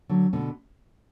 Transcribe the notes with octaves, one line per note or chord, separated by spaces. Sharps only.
D3 F#3
B2 D3